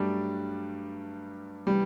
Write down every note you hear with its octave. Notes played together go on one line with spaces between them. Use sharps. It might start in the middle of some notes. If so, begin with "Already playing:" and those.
Already playing: G2 F#3 G3 A3 D4
C3 E3 G3 B3